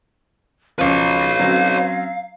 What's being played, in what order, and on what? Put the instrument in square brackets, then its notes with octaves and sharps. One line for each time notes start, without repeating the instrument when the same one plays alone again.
[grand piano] C#2 F3 [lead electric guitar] B4 C#5 [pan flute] F5
[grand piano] F#3 C4 C#4